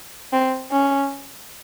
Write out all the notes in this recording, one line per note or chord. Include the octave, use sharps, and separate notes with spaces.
C4
C#4